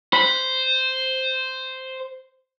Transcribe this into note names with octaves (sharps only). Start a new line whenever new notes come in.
C5 B5